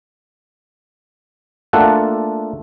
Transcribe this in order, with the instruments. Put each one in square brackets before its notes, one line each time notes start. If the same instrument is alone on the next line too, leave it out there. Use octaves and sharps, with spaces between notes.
[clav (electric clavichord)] A3 A#3 D4 F4 A4 F#5